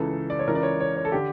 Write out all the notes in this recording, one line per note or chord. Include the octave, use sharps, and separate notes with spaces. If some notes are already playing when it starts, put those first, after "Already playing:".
Already playing: C#2 C#3 E3 A4
D5
C#5
C#2 C#3 E3 A#4
D5
C#5
C#5
C#5
A4
D3 G4